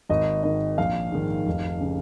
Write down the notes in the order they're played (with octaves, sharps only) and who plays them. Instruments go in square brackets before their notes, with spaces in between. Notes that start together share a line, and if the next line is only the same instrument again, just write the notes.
[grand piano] G#1 D#5
G#2 D#3 D#5
A#1 F5
G#2 D#3
F1
C#3